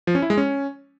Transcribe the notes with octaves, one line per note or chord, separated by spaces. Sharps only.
F3
C#4
E4
G#3
C#4